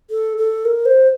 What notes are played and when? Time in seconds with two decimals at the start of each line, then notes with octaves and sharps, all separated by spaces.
0.10 A4
0.38 A4
0.65 A#4
0.86 C5